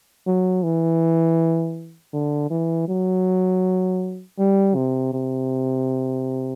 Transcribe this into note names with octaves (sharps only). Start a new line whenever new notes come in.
F#3
E3
D3
E3
F#3
G3
C3
C3